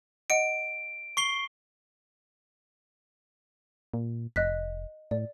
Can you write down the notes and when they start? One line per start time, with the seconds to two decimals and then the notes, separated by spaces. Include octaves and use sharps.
0.30 D#5 F#5 C#7 D7
1.17 C#6 C7 G7
3.94 A#2
4.36 F1 D#5 F#6 B6
5.11 A2 D5